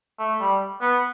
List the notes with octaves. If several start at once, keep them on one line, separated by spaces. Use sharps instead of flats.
A3
G3
B3